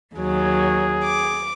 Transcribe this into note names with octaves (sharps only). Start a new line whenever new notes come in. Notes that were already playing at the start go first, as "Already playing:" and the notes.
D#2 F#3 G#4
D6